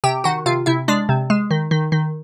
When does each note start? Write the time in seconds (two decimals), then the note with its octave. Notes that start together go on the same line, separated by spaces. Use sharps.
0.04 C3 G4 G5
0.24 D#3 F#4 F#5
0.46 C3 F4 F5
0.66 C3 E4 E5
0.88 G#3 D4 D5
1.09 C3
1.30 G#3
1.51 D#3
1.71 D#3
1.92 D#3